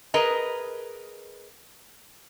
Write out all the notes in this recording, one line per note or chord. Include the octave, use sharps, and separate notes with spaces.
G#4 A#4 B4 D#5 A#5